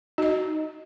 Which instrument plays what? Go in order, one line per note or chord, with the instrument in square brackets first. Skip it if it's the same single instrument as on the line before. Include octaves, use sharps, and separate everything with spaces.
[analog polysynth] D#4 [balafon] F#4 D#5